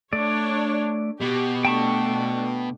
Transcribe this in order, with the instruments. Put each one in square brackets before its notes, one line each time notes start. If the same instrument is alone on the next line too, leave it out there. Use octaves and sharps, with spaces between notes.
[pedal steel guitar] A3 D5 [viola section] D4 C#5
[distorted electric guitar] B2 [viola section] G4
[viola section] A3 D4 [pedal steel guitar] G5 A5 C#6